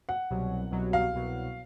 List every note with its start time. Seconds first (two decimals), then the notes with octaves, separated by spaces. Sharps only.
0.09 F#5
0.30 C2 B2 F#3
0.71 C2 B2 F#3
0.93 F5
1.13 C2 B2 F#3